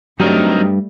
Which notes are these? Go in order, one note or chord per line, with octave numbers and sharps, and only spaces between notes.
G2 F#3 G3 A3 C4 D#4 A#4